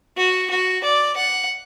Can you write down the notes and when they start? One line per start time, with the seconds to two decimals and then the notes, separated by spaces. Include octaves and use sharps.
0.17 F#4
0.51 F#4
0.84 D5
1.17 F#5